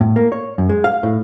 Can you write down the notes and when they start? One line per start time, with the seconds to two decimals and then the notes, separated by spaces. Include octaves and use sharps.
0.01 A2
0.16 A#3
0.32 C#5
0.58 F#2
0.69 G#3
0.84 F5
1.03 A2